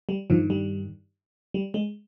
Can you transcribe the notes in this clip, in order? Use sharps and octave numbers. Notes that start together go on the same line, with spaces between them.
G3
G2 D#3 F3
G3
G3
G#3